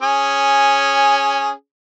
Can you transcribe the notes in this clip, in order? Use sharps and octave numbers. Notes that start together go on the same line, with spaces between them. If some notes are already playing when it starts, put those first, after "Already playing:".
C#4 G#4